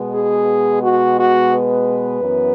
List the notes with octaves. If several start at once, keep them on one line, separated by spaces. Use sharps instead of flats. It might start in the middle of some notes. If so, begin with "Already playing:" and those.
Already playing: B2 G#3 B3
G#4
F#4
F#4
B4
F#2 E3 B3